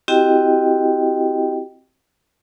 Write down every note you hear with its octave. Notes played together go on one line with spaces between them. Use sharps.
C4 E4 F#4 G4 D#5 G5